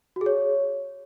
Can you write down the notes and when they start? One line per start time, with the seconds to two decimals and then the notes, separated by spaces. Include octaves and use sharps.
0.16 F#4
0.21 G#4
0.26 C#5